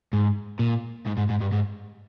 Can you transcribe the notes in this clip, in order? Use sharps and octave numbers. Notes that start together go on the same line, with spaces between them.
G#2
A#2
G#2
G#2
G#2
G2
G#2